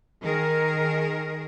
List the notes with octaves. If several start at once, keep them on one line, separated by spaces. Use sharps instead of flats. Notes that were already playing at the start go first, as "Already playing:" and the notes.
D#3 G#4 A#4